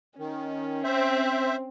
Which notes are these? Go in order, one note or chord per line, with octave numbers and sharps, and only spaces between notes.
D#3 C#4
C4 C5 E5